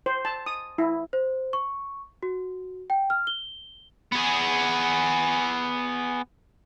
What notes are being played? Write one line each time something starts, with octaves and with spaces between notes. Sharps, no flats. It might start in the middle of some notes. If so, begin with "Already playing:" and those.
C5
A5
D#6
E4
C5
C#6
F#4
G5
F6
G7
B3 G#4